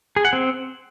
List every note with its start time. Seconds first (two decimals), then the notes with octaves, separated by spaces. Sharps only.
0.16 G#4
0.25 F#5
0.33 C4